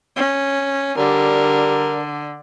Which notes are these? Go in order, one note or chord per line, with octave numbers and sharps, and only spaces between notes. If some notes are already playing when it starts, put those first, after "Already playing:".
C#4
D3 G3 A#4